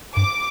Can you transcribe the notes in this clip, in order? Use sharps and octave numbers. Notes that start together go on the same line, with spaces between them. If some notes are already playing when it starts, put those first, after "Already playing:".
G2 D6